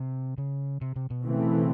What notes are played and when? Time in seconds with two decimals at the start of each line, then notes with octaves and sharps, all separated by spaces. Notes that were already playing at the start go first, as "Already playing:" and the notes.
Already playing: C3
0.38 C#3
0.81 C3
0.96 C3
1.10 B2
1.25 C#3 E3 A3 C4